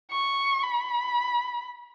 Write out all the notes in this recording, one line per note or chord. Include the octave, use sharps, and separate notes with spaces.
C#6
B5